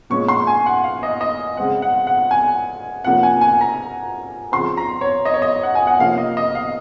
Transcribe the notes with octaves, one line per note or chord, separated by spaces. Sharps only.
A#2 G#3 C#4 C#6
C6
G#5
F#5
F5
D#5
D#5
C#3 G#3 C4 F#5
F#5
F#5
G#5
C3 F3 A#3 C#4 F#5
G#5
G#5
A#5
C#3 F3 C4 C6
A#5
C#5
D#5
C#5
D#5
F#5
G#5
F#5
C3 F3 A#3 C#4 F5
D#5
D#5
F5